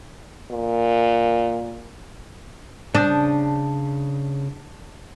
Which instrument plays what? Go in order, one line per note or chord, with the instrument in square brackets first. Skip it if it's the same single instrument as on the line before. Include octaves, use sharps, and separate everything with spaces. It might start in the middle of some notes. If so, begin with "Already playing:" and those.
[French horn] A#2
[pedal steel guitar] C#3 D#6 G6 [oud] D4